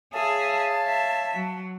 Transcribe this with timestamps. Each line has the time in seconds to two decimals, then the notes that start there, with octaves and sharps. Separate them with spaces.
0.14 G#4 C#5 E5 F5 A5
0.86 E5
1.33 F#3